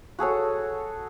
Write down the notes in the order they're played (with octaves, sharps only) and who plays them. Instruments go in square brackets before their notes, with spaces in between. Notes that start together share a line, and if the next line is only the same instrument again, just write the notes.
[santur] F#4 G#4 A4 C#5